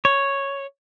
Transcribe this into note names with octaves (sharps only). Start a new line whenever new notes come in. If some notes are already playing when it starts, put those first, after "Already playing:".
C#5